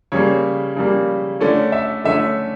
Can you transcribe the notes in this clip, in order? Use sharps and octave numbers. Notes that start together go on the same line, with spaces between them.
C#3 G3 A#3 C#5
C#3 G3 A#3
D3 A3 C#4 D5
E5
D3 A3 C#4 E5